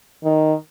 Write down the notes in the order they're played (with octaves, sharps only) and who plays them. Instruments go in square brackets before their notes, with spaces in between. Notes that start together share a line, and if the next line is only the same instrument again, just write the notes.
[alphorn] D#3